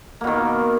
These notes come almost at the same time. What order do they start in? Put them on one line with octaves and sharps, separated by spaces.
A#3 B2 D#3